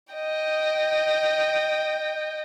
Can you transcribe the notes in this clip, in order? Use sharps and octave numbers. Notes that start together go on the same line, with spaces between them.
D#5 G5